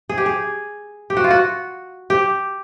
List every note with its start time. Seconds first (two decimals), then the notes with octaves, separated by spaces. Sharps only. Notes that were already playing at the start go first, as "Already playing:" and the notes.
0.09 G#4
0.18 G4
0.26 G#4
1.10 G4
1.17 F#4
1.24 F4
1.31 F#4
2.10 G4